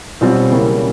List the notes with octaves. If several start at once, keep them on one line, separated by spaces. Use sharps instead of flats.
B1 B2 G3 C4 F4
C#3 E3 G3 A#3 C#4